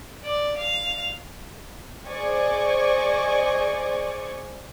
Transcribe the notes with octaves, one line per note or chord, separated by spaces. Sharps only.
D5
F5
G#4 C5 D5 D#5 G#5 C#6